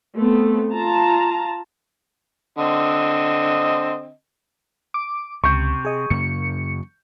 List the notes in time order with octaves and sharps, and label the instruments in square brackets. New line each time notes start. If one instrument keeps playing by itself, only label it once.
[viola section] A3 B3 C4
F4 A5 A#5
[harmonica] D3 C4 D#5
[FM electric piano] D6
[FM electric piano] C#2 [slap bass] C3 [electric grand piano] C#6 G6
[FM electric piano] G#4 D#5
[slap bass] F#2 C#3 A#3 [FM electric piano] C#7